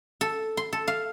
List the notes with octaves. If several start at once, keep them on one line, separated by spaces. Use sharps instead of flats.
A4
C6
A4
F5